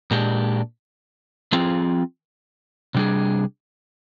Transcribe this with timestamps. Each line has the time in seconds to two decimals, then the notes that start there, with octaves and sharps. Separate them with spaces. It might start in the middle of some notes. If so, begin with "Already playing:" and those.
0.11 A#2 G#3 D4 G4
1.52 F3 C4 F4 G#4
2.95 C3 G3 D4 G#4